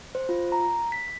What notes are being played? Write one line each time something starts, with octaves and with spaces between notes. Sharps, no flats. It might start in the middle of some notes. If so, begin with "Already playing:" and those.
C5
F4
A#5
B6